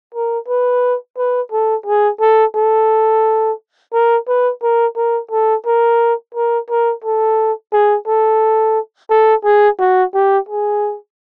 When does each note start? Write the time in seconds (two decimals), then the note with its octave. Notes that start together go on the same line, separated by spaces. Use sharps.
0.15 A#4
0.48 B4
1.17 B4
1.52 A4
1.86 G#4
2.21 A4
2.56 A4
3.94 A#4
4.28 B4
4.63 A#4
4.96 A#4
5.31 A4
5.66 A#4
6.35 A#4
6.70 A#4
7.04 A4
7.73 G#4
8.07 A4
9.11 A4
9.45 G#4
9.80 F#4
10.14 G4
10.49 G#4